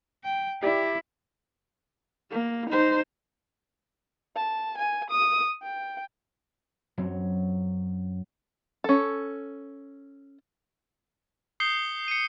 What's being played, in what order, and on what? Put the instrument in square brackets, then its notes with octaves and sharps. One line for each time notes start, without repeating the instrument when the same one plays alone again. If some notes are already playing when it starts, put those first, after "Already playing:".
[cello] G5
[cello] E4 [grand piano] G4 D5
[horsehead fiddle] A#3
D#4 C5
[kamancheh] A5
G#5
D#6
G5
[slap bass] F#2 C4 [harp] F#3
[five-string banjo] C#4 A4
[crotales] D#6 G6 C7 C#7 G7
C#7 D#7